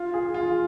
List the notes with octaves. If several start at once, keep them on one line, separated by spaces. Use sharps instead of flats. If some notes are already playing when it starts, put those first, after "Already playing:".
Already playing: F4
G#4
F4